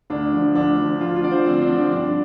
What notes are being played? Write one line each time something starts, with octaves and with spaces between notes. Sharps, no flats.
D2 D4
D3 F3
D2 D4
D3 F3
D2 F4
F4
D3 F3 D5
C5
D2 C4
D4
D3 F3
C4
G2 D4